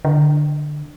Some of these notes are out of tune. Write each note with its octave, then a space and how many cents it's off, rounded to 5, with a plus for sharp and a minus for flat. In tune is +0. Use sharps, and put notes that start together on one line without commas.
D3 +15